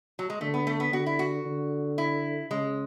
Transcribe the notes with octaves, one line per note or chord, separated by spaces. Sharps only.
F#3
G#3
D3 A3
B3
A3
B3
D3 F#4
E4
F#4
D3
E4
C#3 G#3